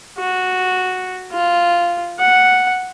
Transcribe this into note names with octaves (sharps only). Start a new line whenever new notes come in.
F#4
F4
F#5